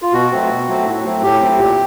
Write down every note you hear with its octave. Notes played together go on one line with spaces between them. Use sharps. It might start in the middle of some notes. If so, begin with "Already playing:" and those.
F4
B2 F#4
F#3 A3 C4
B2
F#3 A3 C4
A2
F#3 A3 C4
A2 G4
F#3 A3 C4
A#2 G4